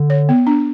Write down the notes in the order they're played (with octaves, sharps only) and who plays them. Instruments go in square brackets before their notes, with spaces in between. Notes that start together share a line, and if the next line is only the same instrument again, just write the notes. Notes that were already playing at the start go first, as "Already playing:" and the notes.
Already playing: [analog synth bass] D3
[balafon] C#5
B3
D4